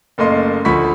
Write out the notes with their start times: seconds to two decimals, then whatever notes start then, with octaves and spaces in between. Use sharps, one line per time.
0.18 F#1 A3 A#3 D#5 C6
0.65 D2 F3 B5 C#6 B6